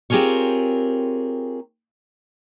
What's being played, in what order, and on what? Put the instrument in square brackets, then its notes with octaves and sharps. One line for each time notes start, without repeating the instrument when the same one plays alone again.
[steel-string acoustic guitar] C4 F4 G4 G#4 A#4 C#5